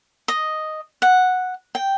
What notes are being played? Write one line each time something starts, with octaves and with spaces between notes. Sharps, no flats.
D#5
F#5
G5